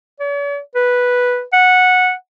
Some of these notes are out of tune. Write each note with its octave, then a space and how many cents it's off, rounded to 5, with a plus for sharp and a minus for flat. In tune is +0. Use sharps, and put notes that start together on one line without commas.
C#5 +45
B4 -5
F#5 -10